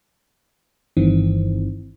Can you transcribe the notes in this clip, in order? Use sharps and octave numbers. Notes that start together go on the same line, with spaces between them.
G1 G2 D#3 E3 C4